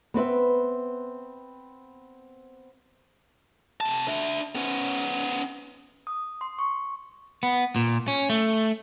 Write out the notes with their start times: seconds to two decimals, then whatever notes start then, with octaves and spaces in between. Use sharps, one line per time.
0.14 B3 C4 B4 E5
3.81 C3 A5
4.08 D4 E5
4.55 B3 C#4
6.07 D#6
6.41 C6
6.59 C#6
7.43 B3
7.76 A#2
8.08 C#4
8.30 A3